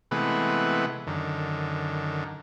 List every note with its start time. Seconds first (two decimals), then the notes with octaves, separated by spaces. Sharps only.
0.11 C3 E3 G#3 A3 B3 B4
1.07 F#2 D3 D#3